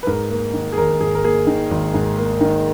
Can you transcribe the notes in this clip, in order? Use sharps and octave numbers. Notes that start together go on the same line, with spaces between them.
B4
G#2 A#4
A#3
D#3
G#4
G#1 A#4
G#2 G#4
A#4
A#3 G#4
D#3
G#1
G#2
A#3
D#3